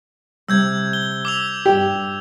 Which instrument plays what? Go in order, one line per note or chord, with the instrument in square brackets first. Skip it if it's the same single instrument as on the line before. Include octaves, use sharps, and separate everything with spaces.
[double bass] C3 [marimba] G3 [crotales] E6 G6 G#6
[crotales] G7
D6 E6 F7
[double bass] G2 [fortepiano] G4